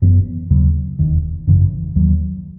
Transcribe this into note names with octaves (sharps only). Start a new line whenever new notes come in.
F#1 F#2 E3 B3
D#2 C#3 F#3
E1 D#2 D#3
G#1 F#2 C#3 E3
D#2 D#3 F#3